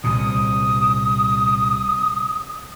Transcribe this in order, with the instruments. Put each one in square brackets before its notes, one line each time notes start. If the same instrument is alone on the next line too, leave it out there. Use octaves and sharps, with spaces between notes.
[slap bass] C2 A#2 [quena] D#6